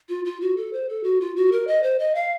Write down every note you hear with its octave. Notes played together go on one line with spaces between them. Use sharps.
F4
F4
F#4
A4
C5
A4
F#4
F4
F#4
A#4
D#5
C5
D#5
F5